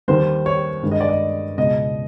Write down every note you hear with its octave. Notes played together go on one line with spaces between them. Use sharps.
D#2 D#3 G3 C5
C#5
G2 D#3 G#3
D#5
D5
D#5
C#2 B2 G#3 B3 D#5